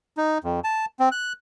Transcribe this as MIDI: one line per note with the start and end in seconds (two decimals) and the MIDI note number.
0.17 0.38 63
0.44 0.60 41
0.64 0.85 81
1.00 1.09 60
1.11 1.33 90